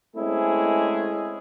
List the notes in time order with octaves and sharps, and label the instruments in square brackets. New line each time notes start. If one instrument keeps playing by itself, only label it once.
[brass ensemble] G#3 A3 C4 C#4 E4 G#4